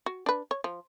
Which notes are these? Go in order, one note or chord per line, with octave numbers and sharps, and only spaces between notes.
F#4
D4 B4
C#5
F3